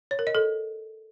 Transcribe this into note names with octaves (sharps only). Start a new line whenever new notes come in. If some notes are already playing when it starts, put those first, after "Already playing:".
C#5
A#4
D#5
A4